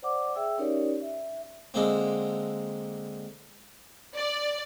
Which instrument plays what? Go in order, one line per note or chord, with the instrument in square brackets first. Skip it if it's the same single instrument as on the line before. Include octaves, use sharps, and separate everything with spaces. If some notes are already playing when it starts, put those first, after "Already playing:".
[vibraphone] C5 D5 F#5 D6
G#4 E5 G5 E6
C#4 D#4 G4 A#4 C#5 D5
E5
[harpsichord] D3 G#3 A#3 C4
[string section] D5